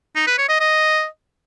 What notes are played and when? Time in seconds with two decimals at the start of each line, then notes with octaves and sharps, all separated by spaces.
0.15 D#4
0.27 B4
0.38 C#5
0.49 D#5
0.60 D#5